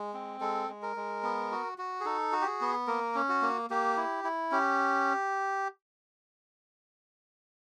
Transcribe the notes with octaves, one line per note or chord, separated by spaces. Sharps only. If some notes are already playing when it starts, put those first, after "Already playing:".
Already playing: G#3
C4
G#3 A4
G#3
A#4
G#3
B3
F#4
F#4
G#4
D#4 A4
F#4
G4
G#4
B3
A#3 A#4
C#4
F#4
A#3
A#3 G4
E4
E4
C#4 G4